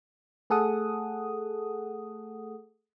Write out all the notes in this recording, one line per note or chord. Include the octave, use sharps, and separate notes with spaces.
A3 G#4 A4 F#5 D#6